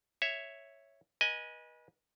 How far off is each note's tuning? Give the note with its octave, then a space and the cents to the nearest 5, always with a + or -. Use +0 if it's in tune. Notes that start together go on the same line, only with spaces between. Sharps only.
C#5 +0 E5 +0
B4 -35 D#5 +0 G#5 +0